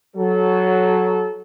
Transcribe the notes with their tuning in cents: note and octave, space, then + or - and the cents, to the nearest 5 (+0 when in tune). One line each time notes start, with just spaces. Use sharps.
F#3 +0 A4 -25